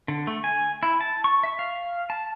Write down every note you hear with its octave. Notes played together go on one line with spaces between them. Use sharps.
D3
A3
G#5
E4
A5
C#6
E5
F5
A5